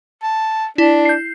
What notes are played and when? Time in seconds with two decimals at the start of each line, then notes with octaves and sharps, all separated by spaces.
0.23 A5
0.78 D4 E4
1.05 G6 C7